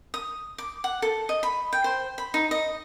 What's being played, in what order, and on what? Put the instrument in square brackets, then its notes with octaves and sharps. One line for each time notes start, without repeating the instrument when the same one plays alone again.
[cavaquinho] D#6
D6
F#5
A4
D#5
B5
G5
C5
B5
D#4
D#5